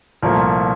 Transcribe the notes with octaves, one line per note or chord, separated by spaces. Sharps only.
C2 A#2 F3 A3 A#4